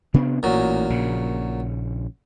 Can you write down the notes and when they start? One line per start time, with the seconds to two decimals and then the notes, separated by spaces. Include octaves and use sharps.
0.14 C3 B3 D4
0.43 A1 A#2 F#3
0.90 A#1 C#3